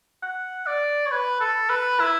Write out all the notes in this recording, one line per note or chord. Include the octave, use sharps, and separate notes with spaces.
F#5
D5
C#5
B4
A4
B4
E4